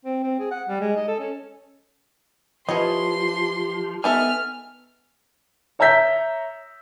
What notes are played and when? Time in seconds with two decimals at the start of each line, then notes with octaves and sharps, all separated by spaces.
0.05 C4
0.23 C4
0.39 G#4
0.51 F#5
0.68 G3
0.81 G#3
0.96 D#5
1.08 A4
1.19 C#4
2.69 E3 F3 G4 C#5 D#5 C6
4.04 D#3 B3 A4 E5 G#5 F6
5.79 C#5 E5 A#5 E6 G6 B6